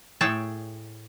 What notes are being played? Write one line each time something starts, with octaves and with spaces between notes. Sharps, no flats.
A2 G#4 A4 C#5 G5 A5